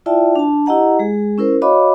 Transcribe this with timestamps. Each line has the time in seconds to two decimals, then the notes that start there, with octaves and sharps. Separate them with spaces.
0.06 E4 F4 D5 E5 G5 A5
0.36 D4 A5
0.66 E4 G4 D#5 F#5 A#5
0.99 G#3 G#4
1.38 C#4 E4 A#4 C5
1.62 F#4 C#5 D#5 F5 B5 D6